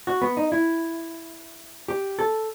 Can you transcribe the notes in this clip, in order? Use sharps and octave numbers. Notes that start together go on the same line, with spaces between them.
F#4
B3
D#4
E4
G4
A4